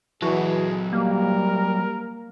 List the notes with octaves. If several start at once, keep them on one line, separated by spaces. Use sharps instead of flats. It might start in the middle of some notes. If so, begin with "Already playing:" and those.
E3 F#3 F#4 G#4 A4
G3 A#3 A#4